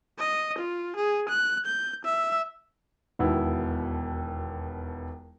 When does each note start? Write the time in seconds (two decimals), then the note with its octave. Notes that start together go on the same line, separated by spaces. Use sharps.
0.18 D#5
0.58 F4
0.96 G#4
1.29 F#6
1.66 G6
2.04 E5
3.19 E1 D#2 B3 E4 F#4